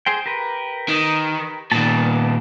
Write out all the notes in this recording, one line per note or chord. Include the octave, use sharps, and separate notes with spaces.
G#4 C5 G5
G4 A#4 B4
D#3
A#2 D#3 G3 B3 A5